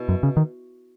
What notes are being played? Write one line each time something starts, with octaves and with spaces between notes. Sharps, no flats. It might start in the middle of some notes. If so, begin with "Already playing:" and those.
Already playing: B2 E4
F#2
C#3
D#3